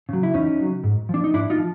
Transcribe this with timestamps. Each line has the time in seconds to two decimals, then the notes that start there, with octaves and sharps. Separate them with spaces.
0.09 C#3 F#3
0.23 E4
0.34 E2 C#4 D#4
0.59 C#3 F#3
0.84 G#2
1.09 F3 D4
1.24 D#4
1.33 G#2 D4 E4
1.50 D#4 F4
1.58 F3